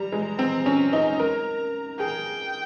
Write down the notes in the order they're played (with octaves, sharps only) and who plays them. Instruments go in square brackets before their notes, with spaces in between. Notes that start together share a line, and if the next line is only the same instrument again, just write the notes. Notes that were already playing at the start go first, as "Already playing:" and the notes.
Already playing: [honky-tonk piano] G3 [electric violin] A#5
[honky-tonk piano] G#3
C4
C#4
D#4
A#4
[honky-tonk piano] G#4 [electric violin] G5